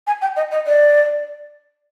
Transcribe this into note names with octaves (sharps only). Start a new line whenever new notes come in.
G#5
G5
D#5
D#5
D5